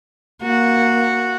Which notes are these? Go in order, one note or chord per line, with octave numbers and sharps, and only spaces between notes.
A#3 F#4